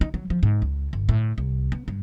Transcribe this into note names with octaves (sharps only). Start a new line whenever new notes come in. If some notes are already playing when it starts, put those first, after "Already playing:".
D#4
F#3
F3
G#2
C#2
G1
A2
C2
B3
G2